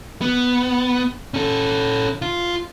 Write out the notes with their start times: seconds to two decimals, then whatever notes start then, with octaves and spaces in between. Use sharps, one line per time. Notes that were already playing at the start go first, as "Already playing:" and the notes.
0.21 B3
1.34 C#4 A4
2.22 F4